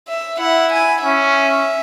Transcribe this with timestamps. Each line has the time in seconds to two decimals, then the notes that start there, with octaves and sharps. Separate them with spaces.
0.08 E5
0.39 E4 F#5
0.72 G#5
1.03 C#4 E5